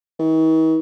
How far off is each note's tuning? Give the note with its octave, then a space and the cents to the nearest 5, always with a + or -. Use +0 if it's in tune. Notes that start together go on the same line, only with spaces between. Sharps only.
D#3 +45